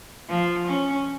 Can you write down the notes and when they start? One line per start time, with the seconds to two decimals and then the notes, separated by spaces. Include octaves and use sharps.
0.29 F3
0.67 C#4